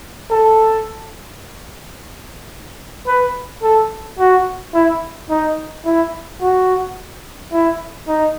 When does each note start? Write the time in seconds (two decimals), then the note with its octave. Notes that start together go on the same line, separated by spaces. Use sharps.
0.30 A4
3.07 B4
3.63 A4
4.19 F#4
4.74 E4
5.30 D#4
5.85 E4
6.41 F#4
7.52 E4
8.08 D#4